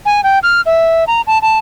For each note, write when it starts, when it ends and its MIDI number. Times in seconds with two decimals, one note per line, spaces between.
0.06 0.21 80
0.24 0.39 79
0.43 0.61 89
0.66 1.04 76
1.07 1.21 82
1.27 1.38 81
1.42 1.58 81